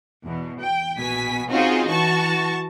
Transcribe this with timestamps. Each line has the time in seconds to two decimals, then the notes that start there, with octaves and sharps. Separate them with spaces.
0.24 E2 B2
0.60 G5
0.96 A#1 B2 G#5 B6
1.50 C4 C#4 D#4 F4 F#4 G#4
1.87 E3 F#4 A5 C#6